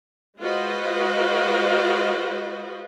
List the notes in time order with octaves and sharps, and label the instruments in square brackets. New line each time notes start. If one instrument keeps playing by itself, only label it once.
[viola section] G#3 F4 F#4 B4 C5 D#5